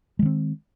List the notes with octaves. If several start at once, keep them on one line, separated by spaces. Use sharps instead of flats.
D#3 G#3 C4